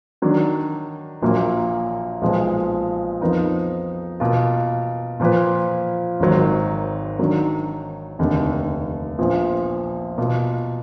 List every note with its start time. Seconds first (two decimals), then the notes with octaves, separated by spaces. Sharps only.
0.22 D#3 F#3 D4
1.22 A#1 A#2 F#3 A#3
2.22 B1 A#2 F3 G#3 B3
3.21 F2 F3 B3 D#4 A#4
4.20 B2 A#3 F4
5.20 A#2 F3 A#3 F4 B4
6.20 G#1 G#2 D#3 F#3
7.19 D#3 F#3 D4
8.19 F1 D#2 D3
9.18 A#1 A#2 F3 B3
10.18 B2 A#3 F4